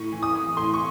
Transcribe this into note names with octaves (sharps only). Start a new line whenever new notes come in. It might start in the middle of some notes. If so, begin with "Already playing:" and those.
Already playing: A2 C#6
E3
D#6
E3
A2 C6
C#6